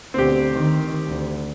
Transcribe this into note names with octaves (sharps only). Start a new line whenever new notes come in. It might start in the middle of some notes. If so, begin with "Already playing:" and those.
D2 B2 C4 G4
D#3
D2